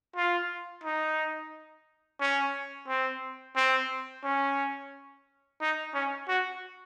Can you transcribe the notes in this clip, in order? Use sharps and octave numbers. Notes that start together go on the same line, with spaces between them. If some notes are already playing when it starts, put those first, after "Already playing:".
F4
D#4
C#4
C4
C4
C#4
D#4
C#4
F#4